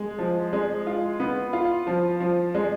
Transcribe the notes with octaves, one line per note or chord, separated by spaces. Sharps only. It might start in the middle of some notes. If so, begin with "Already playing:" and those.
Already playing: G#3
F3
G#3
F4
B3
F4
F3
F3
G#3